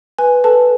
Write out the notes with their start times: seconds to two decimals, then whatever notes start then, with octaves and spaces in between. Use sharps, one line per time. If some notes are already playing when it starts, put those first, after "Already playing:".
0.18 B4 G#5
0.44 A4 B4 A5